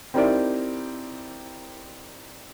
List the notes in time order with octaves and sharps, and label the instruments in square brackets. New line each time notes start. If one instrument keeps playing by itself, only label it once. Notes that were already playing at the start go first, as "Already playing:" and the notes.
[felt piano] C4 D#4 E4 G4 A#4 D5